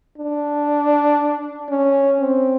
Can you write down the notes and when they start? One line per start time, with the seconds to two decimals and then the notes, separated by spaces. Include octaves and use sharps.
0.18 D4
1.70 C#4
2.20 C4